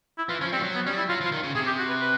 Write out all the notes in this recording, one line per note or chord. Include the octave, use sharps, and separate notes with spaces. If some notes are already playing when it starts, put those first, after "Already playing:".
E4
E3 F4
F3 C#4
G3 C4
F3
F#3
B3
G3 C#4
E4
F#3 F4
F3
F4
D#3
C#3
C3 G#4
G4
F#4
B4
B4